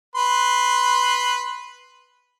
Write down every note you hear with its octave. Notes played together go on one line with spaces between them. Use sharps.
B4 C6